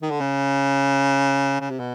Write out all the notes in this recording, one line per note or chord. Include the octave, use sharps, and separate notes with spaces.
D#3
D3
C#3
C#3
C3
B2